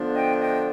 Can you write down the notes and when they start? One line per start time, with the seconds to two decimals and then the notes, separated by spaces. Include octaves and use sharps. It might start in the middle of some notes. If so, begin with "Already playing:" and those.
Already playing: D3 F3 B3 D4
0.15 D#5 G5
0.40 D#5 G5